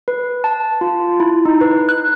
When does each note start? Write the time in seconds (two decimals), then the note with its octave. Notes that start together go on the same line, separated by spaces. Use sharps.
0.08 B4
0.44 A5
0.81 F4
1.20 E4
1.45 D#4
1.61 B4
1.89 F#6